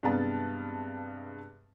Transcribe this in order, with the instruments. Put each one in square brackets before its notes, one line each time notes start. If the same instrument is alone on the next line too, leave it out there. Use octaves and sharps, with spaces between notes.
[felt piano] G2 C3 G#3 B3 F5 A5